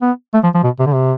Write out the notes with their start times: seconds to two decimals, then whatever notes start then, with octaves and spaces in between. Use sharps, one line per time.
0.02 B3
0.34 A3
0.44 F3
0.55 F3
0.64 B2
0.79 C3
0.87 D3
0.94 C3